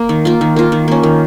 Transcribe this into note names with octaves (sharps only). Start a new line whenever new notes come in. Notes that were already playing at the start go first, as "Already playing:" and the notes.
Already playing: A#3
D#3
A#3 F4
D#3
A#3 F4
D#3
A#3 C#4
D#3